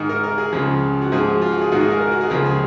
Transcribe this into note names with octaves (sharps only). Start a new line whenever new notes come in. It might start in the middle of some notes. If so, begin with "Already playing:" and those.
Already playing: G#2 D#3
A#4
A#4
G#4
C#2 C#3 F3
F#4
G#2 F3 G#4
F#4
F4
F#4
G#4
G#2 D#3 F#4
G#4
A#4
A#4
F#4
G#4
C#2 C#3 F3 A#4
G#4